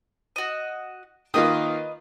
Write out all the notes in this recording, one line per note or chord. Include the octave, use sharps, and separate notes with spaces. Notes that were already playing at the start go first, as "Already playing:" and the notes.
F#4 D#5
D#3 A#3 F4 B4 D#5 D#6